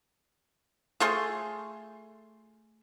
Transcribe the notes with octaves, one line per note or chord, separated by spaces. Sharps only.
A3 F4 G#4 C6